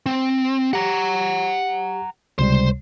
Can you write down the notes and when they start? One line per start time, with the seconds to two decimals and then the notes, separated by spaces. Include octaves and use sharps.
0.06 C4
0.73 G4 F#5 A#5
2.39 C#2 C3 G3 C5